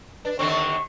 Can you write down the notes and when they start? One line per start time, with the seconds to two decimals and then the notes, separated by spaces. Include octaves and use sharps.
0.25 D4 B4
0.39 D#2 D3 C4 C#6
0.52 C#6